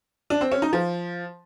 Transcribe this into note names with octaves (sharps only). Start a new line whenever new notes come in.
D4
C4
C#4
D#4
F3